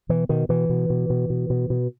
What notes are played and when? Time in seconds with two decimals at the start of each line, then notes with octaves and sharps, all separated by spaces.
0.09 B2 E3
0.29 B2 D#3
0.49 B2 E3
0.70 B2
0.90 B2
1.10 B2
1.30 B2
1.50 B2
1.70 B2